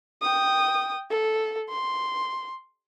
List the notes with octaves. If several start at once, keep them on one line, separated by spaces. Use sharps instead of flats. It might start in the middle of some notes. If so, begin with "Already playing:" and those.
G5 D#6
A4
C6